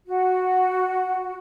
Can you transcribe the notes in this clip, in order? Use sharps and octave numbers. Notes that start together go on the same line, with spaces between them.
F#4